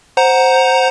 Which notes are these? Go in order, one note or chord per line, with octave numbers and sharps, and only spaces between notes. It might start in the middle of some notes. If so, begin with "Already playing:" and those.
C5 F#5 A#5